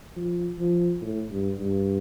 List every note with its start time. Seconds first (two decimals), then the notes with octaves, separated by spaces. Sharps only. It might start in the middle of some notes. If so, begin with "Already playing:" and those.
0.16 F3
0.59 F3
1.02 A2
1.31 G2
1.59 G2